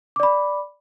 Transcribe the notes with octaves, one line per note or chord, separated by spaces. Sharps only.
D5 B5 D6